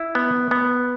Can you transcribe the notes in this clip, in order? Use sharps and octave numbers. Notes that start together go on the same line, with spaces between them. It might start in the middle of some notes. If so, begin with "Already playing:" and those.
Already playing: E4
B3
B3